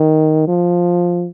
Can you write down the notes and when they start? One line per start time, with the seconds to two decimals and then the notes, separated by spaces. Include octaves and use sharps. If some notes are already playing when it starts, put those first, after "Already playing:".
Already playing: D#3
0.47 F3